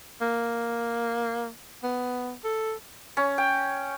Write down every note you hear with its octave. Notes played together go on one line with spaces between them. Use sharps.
A#3
B3
A4
C#4
G5